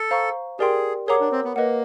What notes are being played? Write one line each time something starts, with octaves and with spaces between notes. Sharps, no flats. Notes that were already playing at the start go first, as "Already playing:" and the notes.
Already playing: A4
C5 F5 A#5 C#6
G4 G#4 A#4 D5 G5 C6
G#4 A#4 C#5 F#5 A#5 D6
D4
C4
B3
A#3 B4 D#5 F#5